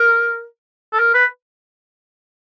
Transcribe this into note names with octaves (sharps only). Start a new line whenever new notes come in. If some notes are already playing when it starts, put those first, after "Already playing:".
Already playing: A#4
A4
A#4
B4